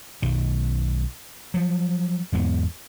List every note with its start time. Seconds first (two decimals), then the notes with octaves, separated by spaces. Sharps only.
0.22 B1 D#3
1.54 F3 F#3
2.32 E2 G#2 G#3 B3